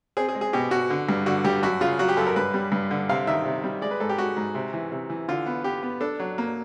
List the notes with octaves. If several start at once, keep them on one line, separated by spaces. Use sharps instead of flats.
C4 G#4
G#4
G#3
G#4
B2 G4
B2 F#4
D3
G2
D3 F#4
G2 G4
F#2 F#4
C#3 F4
F#3 F#4
G4
F#2 A4
A#4
G2 B4
G3
G2
D3
C3 F5
D#3 E5
C3
G3
G#3 D5
B4
G#2 A4
G4
G#3 F#4
G#2
C3
E3
C3
E3
D3 F4
B3
B3 G4
B3
D4 A4
F#3
A#3